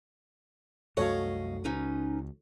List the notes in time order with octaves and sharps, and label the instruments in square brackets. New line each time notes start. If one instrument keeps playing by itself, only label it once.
[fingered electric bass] C2 F#2 A3 [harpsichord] F#4 [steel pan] A4 C#5 [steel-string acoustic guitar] D#5 F5
[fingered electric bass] C#2 [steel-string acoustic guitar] C#4 D#4 B4